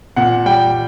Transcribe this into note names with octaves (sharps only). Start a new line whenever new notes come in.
A#2 F#5
G3 G5